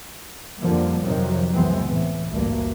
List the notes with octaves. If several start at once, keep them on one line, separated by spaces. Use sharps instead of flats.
F2 D3 F3 G3 A#3
F2 C3 D#3 F3 F#3
C#2 F#2 E3 G#3 B3 C4
A2 E3
A1 D2 G2 A#3